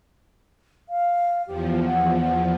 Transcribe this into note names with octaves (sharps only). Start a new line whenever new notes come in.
F5
E2 F3 G4
F#5
F#5